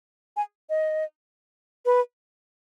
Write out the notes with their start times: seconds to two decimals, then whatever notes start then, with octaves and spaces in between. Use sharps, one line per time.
0.37 G#5
0.70 D#5
1.85 B4